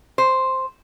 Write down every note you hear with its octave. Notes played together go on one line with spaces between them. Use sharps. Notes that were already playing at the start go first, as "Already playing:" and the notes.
C5